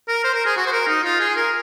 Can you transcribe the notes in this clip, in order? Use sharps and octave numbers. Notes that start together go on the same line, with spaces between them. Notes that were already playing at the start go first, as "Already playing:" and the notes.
A#4
C5
A#4
G#4
F#4
C5
A#4
D#4
F4
G#4
A#4